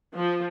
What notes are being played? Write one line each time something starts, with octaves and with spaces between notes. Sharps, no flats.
F3